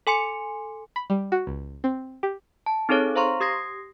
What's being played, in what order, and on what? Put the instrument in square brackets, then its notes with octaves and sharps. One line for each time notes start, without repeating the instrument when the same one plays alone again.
[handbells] A4 G#5 C6 C#7
[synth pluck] B5
G3
F#4
C#2
C4
G4
[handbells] A5
C4 D#4 G#4 A4 C#5
C5 F5 A#5 C6 C#6
G4 D#6 G#6 A#6 C7